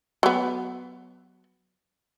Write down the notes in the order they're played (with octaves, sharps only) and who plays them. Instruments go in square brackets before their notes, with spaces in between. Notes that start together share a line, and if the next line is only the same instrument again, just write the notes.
[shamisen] F#3 B3